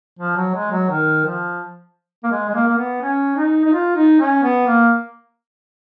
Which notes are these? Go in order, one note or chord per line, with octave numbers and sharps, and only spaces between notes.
F3
F#3
G#3
F#3
D#3
F3
A#3
G#3
G#3
A#3
A#3
B3
C#4
D#4
D#4
F4
D#4
C#4
B3
A#3